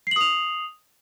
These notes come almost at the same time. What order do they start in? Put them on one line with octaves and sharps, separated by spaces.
C7 F#7 D#6 F7